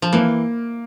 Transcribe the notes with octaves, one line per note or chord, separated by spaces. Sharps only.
F3
E3 A#3